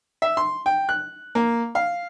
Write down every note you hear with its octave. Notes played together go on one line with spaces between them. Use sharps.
E5
C6
G5
F#6
A#3
F5